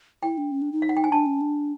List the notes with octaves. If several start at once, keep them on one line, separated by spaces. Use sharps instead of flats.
E4 G5
D4
C#4
D4
D#4
F5
F#5
G5
G#5
D4 A5
C#4
D4